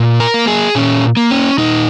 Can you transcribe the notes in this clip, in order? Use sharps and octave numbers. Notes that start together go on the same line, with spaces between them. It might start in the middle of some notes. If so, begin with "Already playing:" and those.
Already playing: A#2
A#4
A#3
G#4
A#2 C#4
A#3
C#4
A#2 D#4